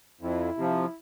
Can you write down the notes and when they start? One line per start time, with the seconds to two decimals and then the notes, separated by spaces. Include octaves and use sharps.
0.21 F2 E4
0.57 C3 F3